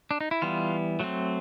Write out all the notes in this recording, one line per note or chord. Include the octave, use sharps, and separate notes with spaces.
D4
D#4
E4
E3 G3 B3 F4
F#3 A3 C4